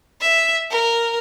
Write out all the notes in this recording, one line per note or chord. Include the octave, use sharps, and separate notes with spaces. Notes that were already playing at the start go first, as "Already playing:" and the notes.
E5
A#4